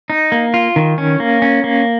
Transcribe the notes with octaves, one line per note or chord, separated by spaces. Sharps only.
D#4
A#3
F4
D#3
C#4
A#3
C#4
A#3